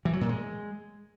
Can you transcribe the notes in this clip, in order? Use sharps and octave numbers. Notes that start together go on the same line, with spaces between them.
E3
F#3
A#2
G#3